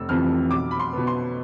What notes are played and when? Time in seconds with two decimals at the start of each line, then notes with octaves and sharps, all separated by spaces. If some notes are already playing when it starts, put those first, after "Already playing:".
Already playing: F1 E6
0.09 F2 C3 E3 F6
0.51 B1 D6
0.71 B5
0.80 C6
0.93 B2 B3
1.07 C6